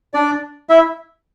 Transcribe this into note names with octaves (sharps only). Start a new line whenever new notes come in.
D4 D5
E4 E5